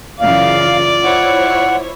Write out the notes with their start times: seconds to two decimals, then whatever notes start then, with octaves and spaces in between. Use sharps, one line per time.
0.20 F#2 C#3 E3 F4 D5 F5
1.04 E4 C5 C#5 F#5